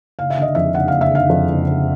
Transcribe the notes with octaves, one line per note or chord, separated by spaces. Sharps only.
F#1 F5
E5
D3 D#5
F2 E5
F#1 F#5
F#1 F5
E5
D3 F5
F2
F#1
F#1